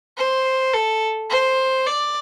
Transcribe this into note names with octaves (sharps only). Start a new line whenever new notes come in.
C5
A4
C5
D5